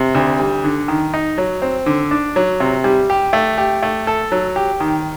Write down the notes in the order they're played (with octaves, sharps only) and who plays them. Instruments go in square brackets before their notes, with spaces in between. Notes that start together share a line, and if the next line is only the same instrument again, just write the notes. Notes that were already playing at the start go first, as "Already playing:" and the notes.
Already playing: [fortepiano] C3
D2
G3
D3
D#3
D#4
F#3
C4
D3
D4
F#3
C3
G3
G4
A3
G4
A3
A4
F#3
G4
D#3